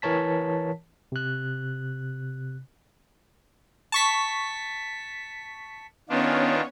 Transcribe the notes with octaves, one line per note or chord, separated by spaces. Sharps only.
E3 A#4 C#5 A5 B6
C3 F#6
A5 C#6 B6
D#3 B3 C#4 D4 F4 C#5